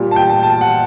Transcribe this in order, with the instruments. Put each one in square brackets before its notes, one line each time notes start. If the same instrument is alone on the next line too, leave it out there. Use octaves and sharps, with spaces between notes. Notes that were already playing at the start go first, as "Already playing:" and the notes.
Already playing: [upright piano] A#2 G3
A5
G5
A5
A5
F#5